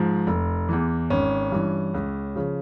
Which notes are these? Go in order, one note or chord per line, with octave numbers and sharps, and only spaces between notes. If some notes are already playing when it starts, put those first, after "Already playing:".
Already playing: G#2 F3
F1
E2 E3
G#1 C#4
G2 E3
C#2
C#3 F3